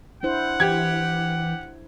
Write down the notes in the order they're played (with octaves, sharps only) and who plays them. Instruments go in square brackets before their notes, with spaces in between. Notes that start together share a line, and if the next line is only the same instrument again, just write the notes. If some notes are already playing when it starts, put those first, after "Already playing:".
[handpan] D4 E4 C5 [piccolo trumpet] F#5
[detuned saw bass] E3 [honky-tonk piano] G4 G#6